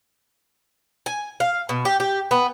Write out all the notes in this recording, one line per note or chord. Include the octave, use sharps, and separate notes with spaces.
G#5
F5
B2
G4
G4
B3